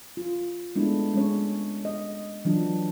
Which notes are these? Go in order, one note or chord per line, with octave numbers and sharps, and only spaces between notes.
F4
G#3 A3 B3 D4 E4
G#3 C#4 C#5
D#5
E3 F#3 D4 F4